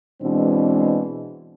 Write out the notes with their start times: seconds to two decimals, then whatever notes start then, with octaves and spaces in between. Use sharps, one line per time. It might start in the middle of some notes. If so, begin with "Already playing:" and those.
0.22 B2 E3 G#3 C4 D4